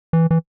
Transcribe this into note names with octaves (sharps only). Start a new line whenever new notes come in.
E3
E3